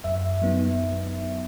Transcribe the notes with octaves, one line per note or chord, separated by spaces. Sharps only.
F#2 E5
F#3 B3 D#4